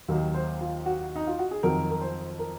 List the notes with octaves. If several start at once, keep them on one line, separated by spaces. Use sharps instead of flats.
D#2 D#3 F#3
C5
F4
F#4
D#4
F4
F#4
G#4
F2 D#3 F#3 A#4
A#4
C5
A#4